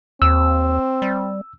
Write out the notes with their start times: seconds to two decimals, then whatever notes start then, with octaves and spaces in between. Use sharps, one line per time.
0.22 D#2 C4 E6
1.02 G3